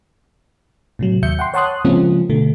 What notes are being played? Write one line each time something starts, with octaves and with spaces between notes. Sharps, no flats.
A2 C3 F#3
D#2 E5 G6 C#7
F#5 G5 C6
C#5 F#5 A5 C6 D#6 F#6
C#3 F3 G#3 A#3 C4 C#4
B2 D3 A3